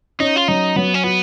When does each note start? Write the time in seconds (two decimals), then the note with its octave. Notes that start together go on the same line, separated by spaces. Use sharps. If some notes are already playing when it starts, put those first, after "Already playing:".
0.20 C#4 D#4
0.36 F4
0.48 F#3 D#4
0.76 F#3 B3
0.94 C#4
1.03 B3 F#4